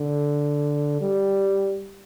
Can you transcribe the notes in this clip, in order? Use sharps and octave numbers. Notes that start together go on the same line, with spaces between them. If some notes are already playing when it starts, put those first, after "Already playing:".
Already playing: D3
G3